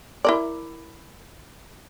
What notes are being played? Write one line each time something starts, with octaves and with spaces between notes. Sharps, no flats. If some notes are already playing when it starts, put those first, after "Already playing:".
E4 A#4 D5